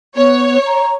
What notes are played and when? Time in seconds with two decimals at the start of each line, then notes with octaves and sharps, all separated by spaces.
0.17 B3 C#5
0.66 A#5